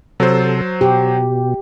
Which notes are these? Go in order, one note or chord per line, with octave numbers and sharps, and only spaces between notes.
C3 F#3 A4 C5
B2 G4